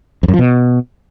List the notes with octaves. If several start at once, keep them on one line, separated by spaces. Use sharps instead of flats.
F2
F#2
F3
B2